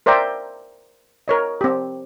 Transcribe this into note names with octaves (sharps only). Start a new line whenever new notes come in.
A#4 C5 D5 E5 G5 A#5
A#4 C#5 D#5
C4 G4